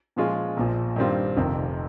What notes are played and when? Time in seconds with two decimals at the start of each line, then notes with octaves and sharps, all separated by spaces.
0.16 A#2 F3 G#3 C#4 F4
0.57 A#1 A#2 F3
0.96 G2 D#3 G3 C4 F4
1.37 F1 F2 C3 D#3